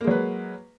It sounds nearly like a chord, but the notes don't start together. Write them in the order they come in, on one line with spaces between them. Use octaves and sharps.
A#3 G#3 F#3 B4